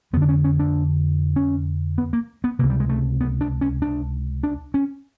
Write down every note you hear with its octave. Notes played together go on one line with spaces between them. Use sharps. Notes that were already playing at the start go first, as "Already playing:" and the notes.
F2 D3 B3
D4
C#4
C#4
D4
C#4
B3
A#3
B3
C#2 C3 A#3
G3
G#3
A3
B3
D4
C#4
D4
D4
C#4